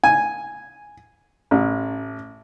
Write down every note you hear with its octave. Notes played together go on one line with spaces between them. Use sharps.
G#5
A1